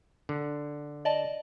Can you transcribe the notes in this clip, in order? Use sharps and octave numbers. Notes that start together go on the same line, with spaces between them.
D3
D5 D#5 A5